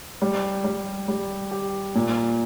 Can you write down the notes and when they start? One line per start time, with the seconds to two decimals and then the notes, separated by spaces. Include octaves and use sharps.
0.22 G3
0.64 G3
1.08 G3
1.51 G4
1.95 A#2